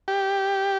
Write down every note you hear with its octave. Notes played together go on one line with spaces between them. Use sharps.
G4